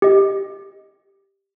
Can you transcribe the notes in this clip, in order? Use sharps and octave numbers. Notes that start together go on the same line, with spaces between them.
G4 D#5